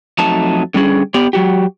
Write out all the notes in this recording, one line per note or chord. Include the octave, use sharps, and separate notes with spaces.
F2 F#3 A3 D#4 A5
D3 G3 C#4 G#4
B3 G4 D5
F#3 F#4 G4